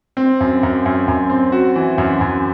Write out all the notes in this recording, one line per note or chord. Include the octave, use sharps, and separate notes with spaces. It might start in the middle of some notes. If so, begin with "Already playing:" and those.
C4
F#2
F#2
F#2
F#2
C4
F#4
E3
F#2
F#2